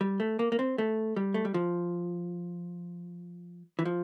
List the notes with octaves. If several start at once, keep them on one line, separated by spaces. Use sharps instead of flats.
G3
A3
A#3
A#3
C4
A3
G3
A3
G3
F3
E3
F3